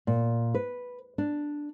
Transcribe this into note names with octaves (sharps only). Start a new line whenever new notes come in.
A#2
B4
D4